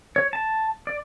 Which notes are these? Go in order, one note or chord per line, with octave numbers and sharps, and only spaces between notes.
C#5
A5
D5